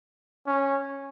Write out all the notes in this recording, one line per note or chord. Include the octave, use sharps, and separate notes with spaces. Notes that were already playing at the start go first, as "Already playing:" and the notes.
C#4